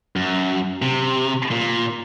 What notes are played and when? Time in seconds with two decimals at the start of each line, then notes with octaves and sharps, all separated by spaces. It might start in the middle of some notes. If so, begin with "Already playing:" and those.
0.16 F#2
0.82 C3
1.51 A#2